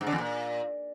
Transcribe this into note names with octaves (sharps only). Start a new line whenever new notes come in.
G#2
D3
E2
A#2